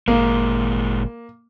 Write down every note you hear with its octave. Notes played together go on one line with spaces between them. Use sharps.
G#1 A#2 G#3 A#3